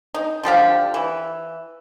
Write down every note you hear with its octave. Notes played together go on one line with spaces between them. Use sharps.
D#4
D3 F3 G4 F5
E3